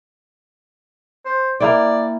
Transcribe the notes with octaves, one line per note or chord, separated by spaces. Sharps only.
C5
A#3 E4 D5 G5